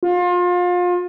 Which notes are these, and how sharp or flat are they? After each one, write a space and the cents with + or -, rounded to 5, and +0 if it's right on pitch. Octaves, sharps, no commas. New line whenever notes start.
F4 +30